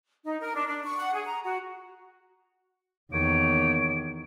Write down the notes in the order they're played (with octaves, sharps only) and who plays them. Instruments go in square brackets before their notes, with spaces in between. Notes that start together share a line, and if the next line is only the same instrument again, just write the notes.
[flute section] D#4
A#4
D4
D4
C#6
F#5
G#4
A#5
F#4
[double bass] E2 D#3 [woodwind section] A#3 G4 C#5 [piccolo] D7